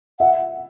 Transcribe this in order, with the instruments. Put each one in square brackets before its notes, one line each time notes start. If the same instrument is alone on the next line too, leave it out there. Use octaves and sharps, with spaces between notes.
[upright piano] E5 [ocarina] F#5